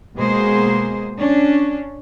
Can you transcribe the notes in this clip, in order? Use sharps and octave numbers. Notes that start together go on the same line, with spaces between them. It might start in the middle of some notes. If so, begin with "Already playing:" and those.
B2 G#3 A#3 G#4 C5
C#4 D4